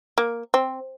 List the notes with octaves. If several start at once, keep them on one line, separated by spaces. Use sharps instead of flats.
A#3
C4